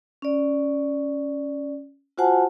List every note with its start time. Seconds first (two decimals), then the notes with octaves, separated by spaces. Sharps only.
0.22 C#4 D5
2.18 F4 F#4 C5 F#5 G#5 A5